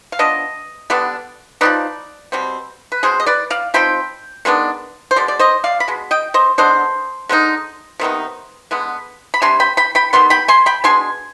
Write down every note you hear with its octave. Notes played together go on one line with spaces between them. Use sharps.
F5
F3 B3 D4 D#5
D3 G3 B3 D4
F3 C4 D#4 B4 D5
B2 G3 C4
B4
B2 G#3 C4 G#4 C5
D#5
B4 D5
D5 F5
F3 C4 D#4 G5 B5
D#3 G#3 B3 D4
C5
B2 G#3 D5
D5
C5 D#5
D5 F5
B5
B2 G#3
D#5 G5
C5 D#5
D3 G#3 B3 D4 C5 D#5
D3 G#3 C4 D#4
C3 D#3 B3 D#4
D3 G#3 B3
B5
C3 G3 D4 G#5 C6
G5 B5
G5 B5
G5 B5
D#3 G3 B3 C6
G5 B5
G#5 C6
G5 B5
B2 G#3 D4 G#5 C6